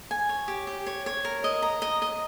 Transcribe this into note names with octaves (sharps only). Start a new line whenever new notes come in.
G#5
C#5
G4
G4
C#5
C#5
A#4
D#5
A#5
D#5
D#5